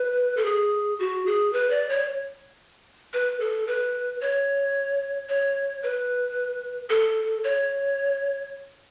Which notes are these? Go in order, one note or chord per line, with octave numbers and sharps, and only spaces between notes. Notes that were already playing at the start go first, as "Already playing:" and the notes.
Already playing: B4
A4
G#4
F#4
G#4
B4
D5
C#5
B4
A4
B4
C#5
C#5
B4
A4
C#5